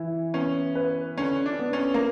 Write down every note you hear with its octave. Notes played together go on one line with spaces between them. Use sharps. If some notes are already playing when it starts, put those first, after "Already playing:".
Already playing: E3 E4
B3 C#4
B4
D3 C#4
D4
B3
C#4
A#3